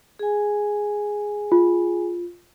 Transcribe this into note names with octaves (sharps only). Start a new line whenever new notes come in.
G#4 G#5
F4